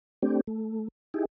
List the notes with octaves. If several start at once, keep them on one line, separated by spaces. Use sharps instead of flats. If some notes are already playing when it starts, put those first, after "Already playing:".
A3 C4 D4 G4
A3
D#4 E4 G4 G#4